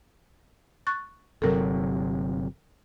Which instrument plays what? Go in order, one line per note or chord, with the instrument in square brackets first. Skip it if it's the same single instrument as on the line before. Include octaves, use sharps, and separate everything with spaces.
[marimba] C#6 F#6 A6
[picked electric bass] G1 C3 F#3 [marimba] A4 A#4